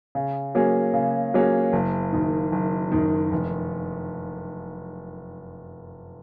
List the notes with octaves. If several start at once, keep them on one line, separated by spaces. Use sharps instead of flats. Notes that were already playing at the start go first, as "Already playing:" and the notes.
C#3
F#3 A#3 C#4 G#4
C#3
F#3 A#3 C#4 G#4
F#1
F#2 D#3
F#1
F#2 D#3
F1